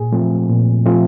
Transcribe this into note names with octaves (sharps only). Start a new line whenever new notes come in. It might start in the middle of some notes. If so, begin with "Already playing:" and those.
Already playing: A#2 G#4
F3 A3 C4
A#2
F3 A3 C4